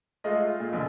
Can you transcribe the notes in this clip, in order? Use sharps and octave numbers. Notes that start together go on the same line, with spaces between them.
G#3 A3 F4 D#5
F4
A#2
A#1 B2 D3